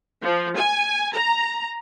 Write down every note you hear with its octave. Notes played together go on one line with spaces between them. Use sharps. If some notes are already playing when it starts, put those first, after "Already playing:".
F3
G#5
A#5